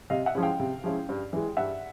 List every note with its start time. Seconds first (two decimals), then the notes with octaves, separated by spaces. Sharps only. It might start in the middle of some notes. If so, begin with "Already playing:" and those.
0.10 C3 D#5 F5
0.26 E5 F#5
0.35 F3 G#3 C#4 E4
0.43 F5 G5
0.60 C3
0.84 F3 G#3 C#4 E4
1.09 G2
1.33 E3 G#3
1.57 G2 E5 F#5